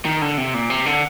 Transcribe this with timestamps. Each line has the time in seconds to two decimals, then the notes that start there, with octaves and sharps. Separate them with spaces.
0.05 D#3
0.22 D3
0.38 C3
0.54 A#2
0.70 C3
0.86 D3